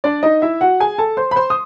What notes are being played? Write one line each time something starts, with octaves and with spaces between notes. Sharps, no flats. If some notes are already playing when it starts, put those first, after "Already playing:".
D4 D5
D#4 D#5
E4 E5
F#4 F#5
G#4 G#5
A4 A5
C5 C6
B5
C5 C6
D#6